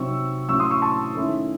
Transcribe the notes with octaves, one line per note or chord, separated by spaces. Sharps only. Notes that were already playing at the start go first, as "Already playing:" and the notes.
Already playing: C3 F#3 C4 D#4 C#6 E6
A2 F#3 C#4 C#6 E6
C6 D#6
C#6 E6
A5 C#6
D#3 A3 C#4 E4